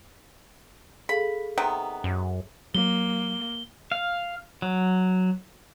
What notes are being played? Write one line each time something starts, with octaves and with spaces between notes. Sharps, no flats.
G#4 A4 F5 B5
C3 D#3 B3
F#2
F#3 A#3 G7
F5
F#3